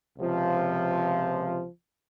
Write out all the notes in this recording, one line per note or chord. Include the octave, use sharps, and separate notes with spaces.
C#2 C3 F3